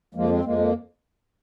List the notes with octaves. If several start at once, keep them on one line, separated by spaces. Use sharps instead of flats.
F2 F3 G#3 A#3
G#3 C4
F2 F3 G#3 A#3
A#3